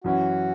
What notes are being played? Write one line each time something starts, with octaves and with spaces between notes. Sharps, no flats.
F#2 E3 C#4 E4 F#4